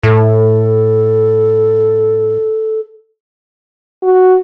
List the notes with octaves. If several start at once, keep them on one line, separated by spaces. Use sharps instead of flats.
A2 A4
F#4